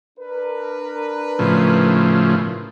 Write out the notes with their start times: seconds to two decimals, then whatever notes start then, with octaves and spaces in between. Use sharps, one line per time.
0.18 D4 A#4 B4
1.39 A2 C#3 F3